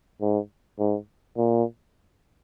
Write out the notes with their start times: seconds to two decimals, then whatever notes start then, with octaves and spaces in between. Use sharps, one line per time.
0.21 G#2
0.79 G#2
1.37 A#2